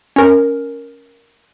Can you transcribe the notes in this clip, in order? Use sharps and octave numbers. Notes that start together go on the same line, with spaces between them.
C#4 A#4